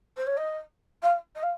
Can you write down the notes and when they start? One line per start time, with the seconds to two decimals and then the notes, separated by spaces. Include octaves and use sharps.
0.17 C5
0.26 C#5
0.37 D#5
1.02 F5
1.35 D#5
1.42 F5